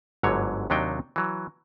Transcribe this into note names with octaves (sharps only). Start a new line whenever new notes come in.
G1 G#2 D3 F#3 C#5
D#2 C3 F#3 D4 D#4 G5
E3 F#3